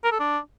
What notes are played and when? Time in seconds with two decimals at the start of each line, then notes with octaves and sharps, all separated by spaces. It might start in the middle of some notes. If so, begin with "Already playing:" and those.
0.04 A#4
0.12 A4
0.19 D4